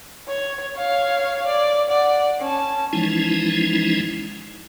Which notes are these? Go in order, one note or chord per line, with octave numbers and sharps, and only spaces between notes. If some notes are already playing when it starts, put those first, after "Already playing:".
C#5
C#5 F5
D5
D5 F#5
C#4 A5
E3 F3 G#3 C#4 D#4 E4